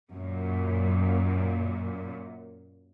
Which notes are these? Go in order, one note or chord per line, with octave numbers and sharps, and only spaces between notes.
F#2 A#2